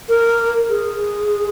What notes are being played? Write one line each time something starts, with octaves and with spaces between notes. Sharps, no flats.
A#4
G#4